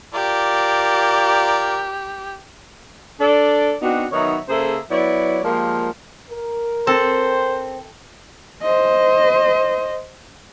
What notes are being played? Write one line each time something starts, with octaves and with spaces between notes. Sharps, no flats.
F4 G4 A#4 D5
D4 A4 D5
B3 C4 D4 D#4 F#4
D#3 F#3 B3 D#4 C#5 E5
C#3 A#3 G#4 A4 C5 E5
F#3 B3 E4 C#5 D5
F3 G3 G#3 A#3
A#4
C4 A4 C5
C5 D#5